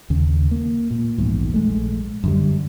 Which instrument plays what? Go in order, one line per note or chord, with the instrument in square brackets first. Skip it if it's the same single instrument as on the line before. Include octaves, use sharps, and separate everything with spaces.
[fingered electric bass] D#2 C#3
A#3
A#2
A#1 E2 G#2
A#1 G#3 A3
F#2 D3 G3